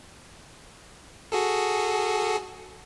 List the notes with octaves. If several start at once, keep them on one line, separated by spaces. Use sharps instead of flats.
F#4 G#4 A4